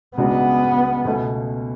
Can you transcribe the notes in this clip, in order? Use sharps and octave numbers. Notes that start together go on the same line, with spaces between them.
C#2 C#3 G#3 B3 D4 F#4
C#2 B2 A3 C#4